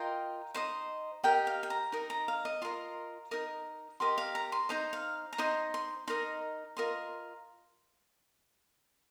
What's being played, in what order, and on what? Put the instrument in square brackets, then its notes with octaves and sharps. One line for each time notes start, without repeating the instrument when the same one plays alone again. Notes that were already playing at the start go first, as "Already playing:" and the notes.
Already playing: [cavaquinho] F4 A#4 D#5 G5
D#4 C5 D#5
G4 A#4 D#5 G5
F5
G5
A#5
D#4 A#4 D#5
A#5
F5
D#5
F4 A#4 D#5 C6
D#4 A#4 D#5 D#6
G4 A#4 D#5 C6
F5
A#5
C6
D#4 C5 D#5 A#5
F5
A#5
D#4 C5 D#5 C6
C6
D#4 A#4 D#5 C6
F4 A#4 D#5 C6